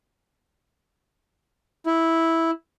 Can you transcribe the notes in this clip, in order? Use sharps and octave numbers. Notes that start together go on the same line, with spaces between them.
E4